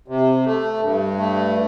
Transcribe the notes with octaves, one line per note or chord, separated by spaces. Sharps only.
C3
A3
G2
A3